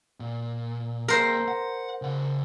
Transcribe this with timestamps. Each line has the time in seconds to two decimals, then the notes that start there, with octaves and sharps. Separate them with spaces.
0.20 A#2
1.08 A#3 G#4 A#4 C5
1.48 F#5
2.02 C#3 F#5